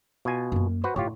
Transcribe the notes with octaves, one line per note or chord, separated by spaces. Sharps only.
B2 F4 G#5
F#2 A#3
F#4 B4 C5
A2 F4 G4 C#5